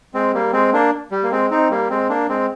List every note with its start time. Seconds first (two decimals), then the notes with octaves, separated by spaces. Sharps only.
0.14 G#3 C4
0.34 G3 A#3
0.53 G#3 C4
0.73 A#3 D4
1.11 G3
1.23 A#3
1.31 G#3 C4
1.50 C4 D#4
1.71 G3 A#3
1.90 G#3 C4
2.09 A#3 D4
2.29 G#3 C4